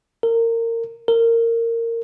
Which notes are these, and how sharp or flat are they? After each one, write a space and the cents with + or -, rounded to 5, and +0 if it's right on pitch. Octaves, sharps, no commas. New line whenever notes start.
A#4 -25
A#4 -20